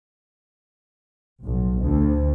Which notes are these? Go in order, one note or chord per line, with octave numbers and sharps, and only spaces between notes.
B1
D2